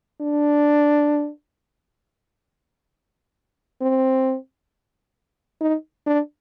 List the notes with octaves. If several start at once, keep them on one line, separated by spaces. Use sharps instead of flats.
D4
C4
D#4
D4